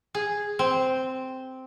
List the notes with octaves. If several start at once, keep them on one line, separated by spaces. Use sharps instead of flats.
G#4
C4